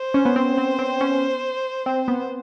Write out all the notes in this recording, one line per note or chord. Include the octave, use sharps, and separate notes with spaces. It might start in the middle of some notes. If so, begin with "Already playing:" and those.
Already playing: C5
C#4
B3
C4
C4
C4
C#4
C4
B3